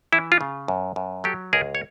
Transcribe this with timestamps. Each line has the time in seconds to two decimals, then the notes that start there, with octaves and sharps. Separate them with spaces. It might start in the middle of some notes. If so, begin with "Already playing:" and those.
0.13 E3 E4
0.32 F4
0.41 C#3
0.68 F#2
0.96 F#2
1.24 F#3 G4 A4
1.53 C#2 G#4 A#4
1.75 C#5